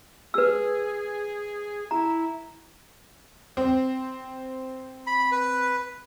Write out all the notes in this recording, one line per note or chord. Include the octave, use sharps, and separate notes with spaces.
G#4 B4 E6
E4 A#5
C4
B5
B4